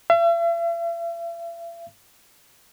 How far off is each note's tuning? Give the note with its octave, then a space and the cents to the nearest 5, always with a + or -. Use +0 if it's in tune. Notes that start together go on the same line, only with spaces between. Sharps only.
E5 +45